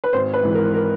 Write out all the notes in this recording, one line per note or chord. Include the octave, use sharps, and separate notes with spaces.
B4
G#1 C5
B4
G#2 E3
A#4
A#4